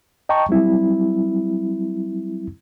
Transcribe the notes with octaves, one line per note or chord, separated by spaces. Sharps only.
D#5 G5 A5 A#5 C#6
F#3 G3 C4 E4